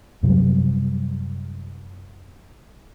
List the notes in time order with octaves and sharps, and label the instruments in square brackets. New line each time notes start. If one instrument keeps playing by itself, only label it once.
[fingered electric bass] F#2 C3 F#3 G3